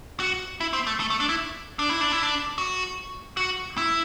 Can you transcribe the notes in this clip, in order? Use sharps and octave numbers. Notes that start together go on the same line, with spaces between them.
F#4
E4
C4
A3
A3
A3
D4
E4
D4
E4
D4
E4
D4
F#4
F#4
E4